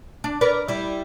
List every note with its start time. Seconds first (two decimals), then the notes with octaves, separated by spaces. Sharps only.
0.24 D4
0.41 A#4 B4 D5
0.68 G3 E4